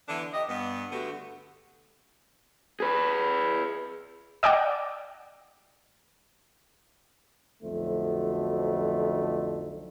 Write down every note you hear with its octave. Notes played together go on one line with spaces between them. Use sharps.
D3 E3 B3 D4
G4 D#5
G2 B3
D3 A3 B3 F#4 G4
G#4 B4
D5 D#5 F#5 G5 D6
B1 F2 D3 F#3 A3 C5